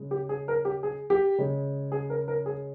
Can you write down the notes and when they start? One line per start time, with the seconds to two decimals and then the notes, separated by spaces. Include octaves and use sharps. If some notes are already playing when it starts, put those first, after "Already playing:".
Already playing: C#3 G#3
0.11 G4
0.29 G#4
0.48 A#4
0.65 G4
0.83 G#4
1.10 G4
1.38 C#3 G#3
1.92 G#4
2.10 A#4
2.28 A#4
2.46 G#4